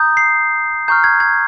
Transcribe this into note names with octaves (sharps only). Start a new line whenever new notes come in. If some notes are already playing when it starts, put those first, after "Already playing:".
Already playing: A#5 D#6 G6
C7
A#5 C#6 F6 G6
G#6
G#6